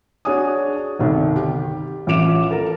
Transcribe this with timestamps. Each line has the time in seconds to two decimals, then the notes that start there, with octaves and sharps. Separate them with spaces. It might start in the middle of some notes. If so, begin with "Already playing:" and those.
0.25 D4 F#4 G#4 C#5 G#5 D#6
0.99 G1 C2 D#3
1.36 G4
2.07 A1 E3 F4 D6 D7 E7
2.51 A4 A#4